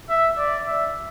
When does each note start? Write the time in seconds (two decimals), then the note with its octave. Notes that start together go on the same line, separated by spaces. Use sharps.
0.09 E5
0.37 D5
0.66 E5